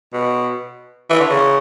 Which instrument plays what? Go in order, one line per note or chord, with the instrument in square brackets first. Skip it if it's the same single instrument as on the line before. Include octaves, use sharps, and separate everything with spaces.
[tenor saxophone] B2
E3
D3
C#3